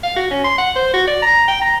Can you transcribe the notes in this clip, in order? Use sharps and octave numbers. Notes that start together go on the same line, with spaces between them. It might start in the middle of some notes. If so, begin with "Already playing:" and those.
F5
F#4
C#4
C6
F#5
C5
F#4
D5
A#5
G5
A#5